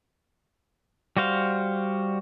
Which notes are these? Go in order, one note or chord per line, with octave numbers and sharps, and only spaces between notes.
G3 F#4 C5 F5